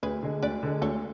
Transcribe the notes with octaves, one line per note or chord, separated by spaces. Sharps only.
D2 G#4 B4
D3 G#3
D2 B4 D5
D3 G#3
D2 A4 C#5